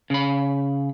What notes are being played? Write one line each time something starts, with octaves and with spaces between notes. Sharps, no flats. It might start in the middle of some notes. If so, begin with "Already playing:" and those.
C#3 B5